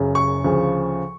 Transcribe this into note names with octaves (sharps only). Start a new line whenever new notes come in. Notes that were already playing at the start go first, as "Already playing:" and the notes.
Already playing: F#1 F#2 C#3
C#6
D2 C#3 F3